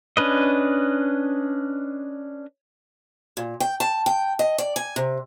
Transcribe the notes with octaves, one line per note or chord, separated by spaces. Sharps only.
C#4 D4 B4 D#5
A#2
G5
A5
G5
D#5
D5
G#5
C3